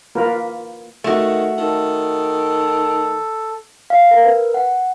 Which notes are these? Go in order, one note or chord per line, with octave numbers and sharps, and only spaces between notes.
A#3 F4 A#4 B4
D#3 A3 F#4
D#3 A4
F5
A#4
B4
F#5